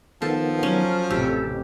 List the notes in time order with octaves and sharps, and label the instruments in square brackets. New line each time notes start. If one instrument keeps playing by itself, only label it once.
[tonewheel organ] D#3 B3 [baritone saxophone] F3 [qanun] A4
[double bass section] F#3 [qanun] C#4
[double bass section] A1 F2 C3 [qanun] G4 [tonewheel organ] A4